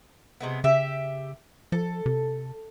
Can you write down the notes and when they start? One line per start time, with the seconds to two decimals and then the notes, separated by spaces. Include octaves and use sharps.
0.40 C3 G#3 B3
0.64 C#3 G4 E5
1.72 F3 A4
2.06 C3